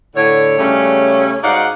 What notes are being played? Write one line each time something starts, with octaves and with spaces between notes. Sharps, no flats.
A2 D3 C#5
C#3 G3 A3 C#4
G#2 D#4 F#4 D5 F5 F#5